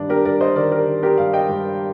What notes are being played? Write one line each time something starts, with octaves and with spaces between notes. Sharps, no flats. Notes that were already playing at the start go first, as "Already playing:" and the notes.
Already playing: G2 D#3 D4
G4 A#4
G2 A#4 D5
C5 D#5
D#3 A#4 D5
G4 A#4
D#3
G4 A#4
G2 D5 F5
D#5 G5
G2